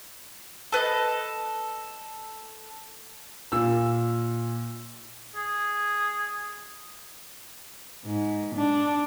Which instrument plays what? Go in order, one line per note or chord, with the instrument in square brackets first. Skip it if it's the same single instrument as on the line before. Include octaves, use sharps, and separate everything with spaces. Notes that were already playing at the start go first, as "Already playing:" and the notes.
[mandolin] A4 B4 D5 D#5
[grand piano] A#2 E6
[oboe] G#4
[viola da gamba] G#2
D4